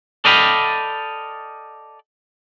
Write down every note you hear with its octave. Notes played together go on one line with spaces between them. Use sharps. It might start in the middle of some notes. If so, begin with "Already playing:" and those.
A4 D5 D#5 F5 G5 B5